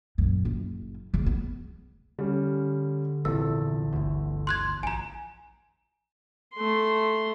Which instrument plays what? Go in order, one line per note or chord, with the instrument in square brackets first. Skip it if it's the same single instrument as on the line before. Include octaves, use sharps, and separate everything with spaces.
[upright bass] F#2 A#2
F#1
C#3 A3
B3
[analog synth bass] D3 [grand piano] G3 C#4
[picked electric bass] A#1 C3 F3 [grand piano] E2 A4 [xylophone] E6
[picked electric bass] G1 D2
[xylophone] C6 F#6 G#6
[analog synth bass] A#1 [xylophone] G#5 A#5
[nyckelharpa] A3 C6